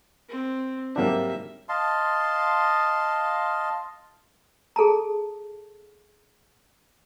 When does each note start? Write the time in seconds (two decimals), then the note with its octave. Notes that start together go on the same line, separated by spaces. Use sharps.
0.29 C4
0.96 G#2 C3 F#3 G3 A#3 D4 E5
1.69 D#5 F5 A5 C6
4.76 G#4 A4 A5 A#5